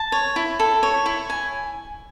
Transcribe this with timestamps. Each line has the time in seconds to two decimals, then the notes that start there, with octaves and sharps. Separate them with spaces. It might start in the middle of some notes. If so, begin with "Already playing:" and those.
Already playing: A5
0.12 C#5
0.36 E4
0.59 A4
0.83 C#5
1.06 E4
1.30 G#5